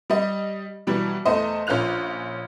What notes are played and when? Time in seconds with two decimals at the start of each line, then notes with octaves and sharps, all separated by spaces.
0.10 G3 D#5
0.87 B2 E3 F#3 G3
1.25 E2 A3 C5 D#5
1.67 A#1 C#4 F4 F#6 F7